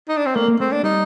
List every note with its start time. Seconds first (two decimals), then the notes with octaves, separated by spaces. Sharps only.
0.08 D#4
0.17 D4
0.26 C4
0.35 A3 A#3
0.48 A#3
0.60 A3 C4
0.72 D4
0.83 G3 D#4